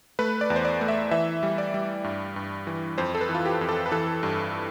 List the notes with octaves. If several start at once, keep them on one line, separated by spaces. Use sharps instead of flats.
A3 B4
D5
E2
C5
D5
A3
E5
E3 E5
G3
D5
G3
G2
G2
E3
F2 C5
A4
B4
E3
F4
G4
F2
A4
B4
E3 A4
G2